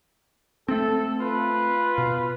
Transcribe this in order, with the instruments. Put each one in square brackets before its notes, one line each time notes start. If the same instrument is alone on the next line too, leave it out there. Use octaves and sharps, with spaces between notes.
[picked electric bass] A3 C4 [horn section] A4
[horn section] F4 B4
[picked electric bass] B2